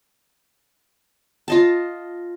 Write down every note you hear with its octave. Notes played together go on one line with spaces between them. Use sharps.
F4 D#5 A5